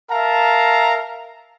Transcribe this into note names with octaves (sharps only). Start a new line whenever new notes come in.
A#4 E5 F5 A5 A#5